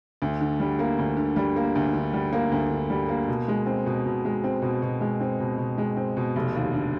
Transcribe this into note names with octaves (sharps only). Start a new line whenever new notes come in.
D2
D3
G3
A#3
D2
D3
G3
A#3
D2
D3
G3
A#3
D2
D3
G3
A#3
B2
G#3
C4
B2
B2
G#3
C4
B2
B2
G#3
C4
B2
B2
G#3
C4
B2
F1
D#2
D3